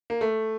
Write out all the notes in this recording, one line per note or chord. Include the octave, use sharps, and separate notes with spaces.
A#3
A3